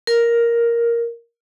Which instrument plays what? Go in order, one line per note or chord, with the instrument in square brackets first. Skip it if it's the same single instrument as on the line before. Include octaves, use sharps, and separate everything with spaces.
[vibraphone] A#4